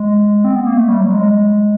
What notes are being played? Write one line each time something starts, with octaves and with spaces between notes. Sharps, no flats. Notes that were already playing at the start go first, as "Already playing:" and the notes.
Already playing: G#3
C4
B3
A#3
A3
G3
F#3
G#3